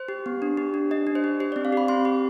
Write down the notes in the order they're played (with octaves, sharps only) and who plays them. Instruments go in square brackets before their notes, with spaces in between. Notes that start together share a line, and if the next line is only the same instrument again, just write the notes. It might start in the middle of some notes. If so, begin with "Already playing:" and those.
Already playing: [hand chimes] C5
G4
B3
D4
G4
D4
D4 D#5
D4
C5
G4
G4 C5
C4 D5
F5
G4 B5
C4 C6
G4